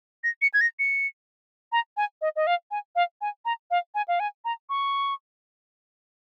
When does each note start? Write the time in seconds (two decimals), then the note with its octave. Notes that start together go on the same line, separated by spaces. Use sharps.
0.24 A#6
0.42 C#7
0.54 G#6
0.61 A#6
0.79 C#7
1.72 A#5
1.97 G#5
2.21 D#5
2.36 D#5
2.47 F5
2.71 G#5
2.96 F5
3.21 G#5
3.45 A#5
3.71 F5
3.95 G#5
4.08 F5
4.20 G#5
4.45 A#5
4.69 C#6